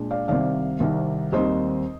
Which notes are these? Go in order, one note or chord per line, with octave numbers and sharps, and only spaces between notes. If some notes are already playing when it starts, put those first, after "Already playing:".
Already playing: A#2 G#3 D4
D5 F5
C2 C3 D#3 D5 F5
C2 C3 D#3
D#2 D#3 G3 C4 C5 D#5